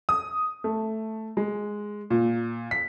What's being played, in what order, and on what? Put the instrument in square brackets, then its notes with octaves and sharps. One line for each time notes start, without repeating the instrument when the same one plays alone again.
[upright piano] D#6
A3
G#3
A#2
B6